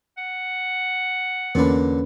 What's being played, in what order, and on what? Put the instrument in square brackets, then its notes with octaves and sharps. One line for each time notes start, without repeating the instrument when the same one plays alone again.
[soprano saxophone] F#5
[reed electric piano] E2 C#4 B4 [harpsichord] A#2 D3